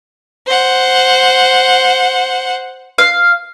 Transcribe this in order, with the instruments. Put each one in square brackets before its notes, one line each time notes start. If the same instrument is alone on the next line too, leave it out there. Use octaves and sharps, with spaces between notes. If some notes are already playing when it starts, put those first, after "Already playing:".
[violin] C5 F#5
[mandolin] F5